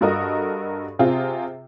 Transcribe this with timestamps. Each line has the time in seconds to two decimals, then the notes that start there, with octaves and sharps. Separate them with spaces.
0.01 G2 F#4 A4 A#4 D#5 D#6
0.99 C3 C4 F4 G#4